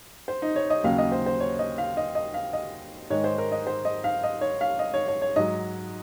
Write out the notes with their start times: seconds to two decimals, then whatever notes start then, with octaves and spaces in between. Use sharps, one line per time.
0.28 C5
0.42 D#4
0.56 C#5
0.70 D#5
0.84 D#2 C#3 F#3 F5
0.98 D#5
1.12 C5
1.26 C5
1.40 C#5
1.59 D#5
1.78 F5
1.97 D#5
2.15 D#5
2.34 F5
2.53 D#5
3.10 G#2 D#3 G#3 C#5
3.24 C5
3.38 A#4
3.52 D#5
3.67 C5
3.85 D#5
4.04 F5
4.24 D#5
4.41 C#5
4.61 F5
4.79 D#5
4.94 C#5
5.08 C#5
5.22 C#5
5.36 G#2 F#3 D#5